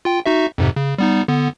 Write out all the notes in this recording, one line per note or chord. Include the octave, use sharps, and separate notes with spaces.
F4 G5
D#4 F#4 E5
F2 G#2 C3
C#3
G3 B3 D#4
D3 B3